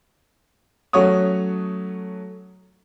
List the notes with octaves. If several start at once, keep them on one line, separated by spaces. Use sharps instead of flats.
F#3 A3 C#4 F#4 C#5 D#6